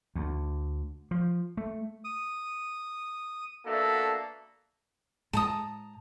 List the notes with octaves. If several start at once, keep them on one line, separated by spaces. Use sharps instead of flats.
D2
F3
A3
D#6
A#3 B3 D4 F#4 A4 E5
A2 G#3 A5 A#5 D#6